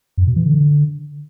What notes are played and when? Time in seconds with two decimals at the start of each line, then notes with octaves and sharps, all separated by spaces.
0.17 F#2
0.27 B2
0.36 E3
0.46 D3